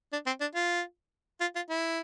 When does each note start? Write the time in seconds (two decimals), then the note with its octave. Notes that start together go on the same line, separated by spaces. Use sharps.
0.12 D4
0.27 C4
0.41 D4
0.55 F4
1.41 F4
1.56 F4
1.70 E4